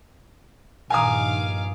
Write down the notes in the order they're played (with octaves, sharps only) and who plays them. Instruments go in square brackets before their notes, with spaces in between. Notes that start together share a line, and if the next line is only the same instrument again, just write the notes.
[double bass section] A#1 G2 D#3 [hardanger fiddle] F5 D6 [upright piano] G#5 A#5 D#6